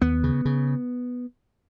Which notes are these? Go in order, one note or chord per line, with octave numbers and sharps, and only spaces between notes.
D#2 B3
C#3
C#3